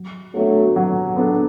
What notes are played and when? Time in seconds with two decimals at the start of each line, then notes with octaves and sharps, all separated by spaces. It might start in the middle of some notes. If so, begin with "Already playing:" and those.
Already playing: F#3
0.34 F#3 A3 B3 D4 A4
0.76 F#3
1.16 B3 D4 A4